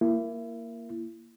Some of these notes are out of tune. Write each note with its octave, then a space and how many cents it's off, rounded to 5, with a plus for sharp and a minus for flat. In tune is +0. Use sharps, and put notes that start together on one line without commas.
A#3 +0 E4 +25